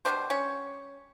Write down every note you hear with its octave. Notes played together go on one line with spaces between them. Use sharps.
B2 G3 B3 C4 D4 C5
C#4 C#5